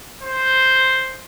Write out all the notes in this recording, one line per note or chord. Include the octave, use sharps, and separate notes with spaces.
C5